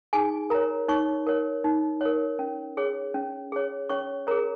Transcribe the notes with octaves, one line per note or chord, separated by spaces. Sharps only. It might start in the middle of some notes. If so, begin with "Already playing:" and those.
D#4 G#4 G#5
A#4 C#5 A#5
D#4 C#5 C#6
A#4 C#5
D#4
A#4 C#5
C#4
G#4 C#5
C#4
G#4 C#5
C#4 C#5 C#6
G#4 A#4 C#5 A#5